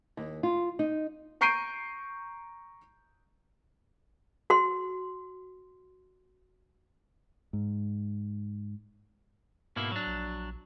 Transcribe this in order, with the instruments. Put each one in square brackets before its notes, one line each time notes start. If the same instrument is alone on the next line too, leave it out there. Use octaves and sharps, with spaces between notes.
[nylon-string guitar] D#2
F4
D#4
[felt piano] A#5 C#6 G6 C7 D7 D#7
[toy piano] F#4 C6
[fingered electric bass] G#2
[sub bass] G#2 [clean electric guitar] B2 A#3 E4
[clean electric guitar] F#3 D4
[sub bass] A#1